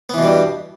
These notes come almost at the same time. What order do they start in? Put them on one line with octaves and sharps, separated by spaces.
B3 E3 B2 G3 G2